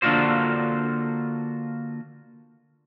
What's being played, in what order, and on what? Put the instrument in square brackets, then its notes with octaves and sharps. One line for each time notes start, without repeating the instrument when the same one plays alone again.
[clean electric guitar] D3 A#3 D4 F4 F#4 C5